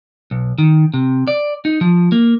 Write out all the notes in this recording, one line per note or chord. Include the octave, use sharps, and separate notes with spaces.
B1
D#3
C3
D5
D#4
F3
A#3